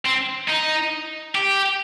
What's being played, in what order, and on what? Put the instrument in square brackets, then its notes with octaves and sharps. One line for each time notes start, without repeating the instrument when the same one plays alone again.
[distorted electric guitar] C4
D#4
G4